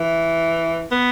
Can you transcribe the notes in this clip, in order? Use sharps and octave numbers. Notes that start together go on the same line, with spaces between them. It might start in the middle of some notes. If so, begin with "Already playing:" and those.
Already playing: E3
B3